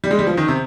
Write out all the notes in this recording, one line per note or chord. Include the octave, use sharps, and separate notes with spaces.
G3
G#3
G3
F3
D#3
C3